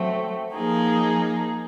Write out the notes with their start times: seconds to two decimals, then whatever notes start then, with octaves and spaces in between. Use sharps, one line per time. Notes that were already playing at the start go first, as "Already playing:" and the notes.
Already playing: F#3 A3 C4
0.54 F3 A#3 D#4 G#4